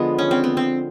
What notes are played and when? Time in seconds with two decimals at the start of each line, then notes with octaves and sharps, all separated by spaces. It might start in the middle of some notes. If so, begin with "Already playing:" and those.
Already playing: D3 F3 G#3 B3
0.18 C#4
0.31 C4
0.44 B3
0.57 C4